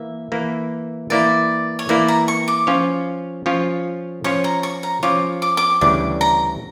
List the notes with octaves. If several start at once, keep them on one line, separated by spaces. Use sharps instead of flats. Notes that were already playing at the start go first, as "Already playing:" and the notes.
Already playing: E3 A#3 E5
E3 A#3 E4
E3 A#3 E4 D5
C#5
E3 A#3 E4 D5
A#5
C#6
D6
F3 C#4 F4 C#5
F3 C#4 F4 C#5
F3 C#4 F4 C#5 C#6
A#5
C#6
A#5
F3 C#4 F4 C#5 D6
D6
D6
D2 C#3 E3 G3 D4 D6
A#5